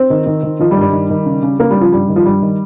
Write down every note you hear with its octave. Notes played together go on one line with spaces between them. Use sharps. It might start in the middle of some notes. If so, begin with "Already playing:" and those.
Already playing: C4
D#3
D#3
D#3
D#3 F3
G3
G2
G3
D#3
D#3
C#3
C#3
C#3 A#3
G3
C#3
F3
G2 G3
D#3
F3
G2 G3
D#3